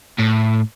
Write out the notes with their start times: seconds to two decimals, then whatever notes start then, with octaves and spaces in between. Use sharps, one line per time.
0.19 A2